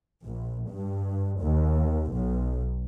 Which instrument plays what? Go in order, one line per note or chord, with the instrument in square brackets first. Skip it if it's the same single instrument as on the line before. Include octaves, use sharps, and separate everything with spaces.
[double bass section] A#1
G2
D#2
B1